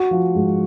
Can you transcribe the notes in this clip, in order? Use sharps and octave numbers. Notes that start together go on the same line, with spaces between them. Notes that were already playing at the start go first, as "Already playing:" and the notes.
Already playing: F#4
F3
G#2